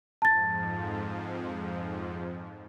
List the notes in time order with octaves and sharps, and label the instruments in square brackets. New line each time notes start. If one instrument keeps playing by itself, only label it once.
[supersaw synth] F2 G#2 F3 [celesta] A5 A6